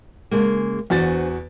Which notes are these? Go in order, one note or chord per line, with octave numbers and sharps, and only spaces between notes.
C#3 G#3 A#3
E2 D4 F#4 C5 G#5 A6